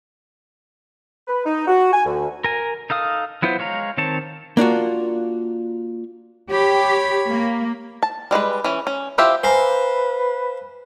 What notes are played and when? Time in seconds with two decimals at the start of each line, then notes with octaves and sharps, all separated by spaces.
1.28 B4
1.45 D#4
1.68 F#4
1.93 G#5
2.05 D2
2.44 A#4 G#5
2.90 D#4 A4 F5 D#6
3.42 F#3 B3 E4 F4 C5
3.59 G#3 C#5 F5 A#5
3.98 D#3 C4 C#5 A5
4.57 A#3 D4 F4 F#4
6.50 G4 C#5 B5
7.29 A#3
8.03 A5
8.31 G3 G#3 D4 B4
8.64 E3 C#4
8.87 C#4
9.18 E4 F4 G4 C5 E5
9.44 B4 C5 F5 G#5 A#5